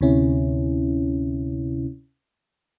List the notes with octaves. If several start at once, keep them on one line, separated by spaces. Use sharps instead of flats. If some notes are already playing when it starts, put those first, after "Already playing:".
D2 C3 C#4 E4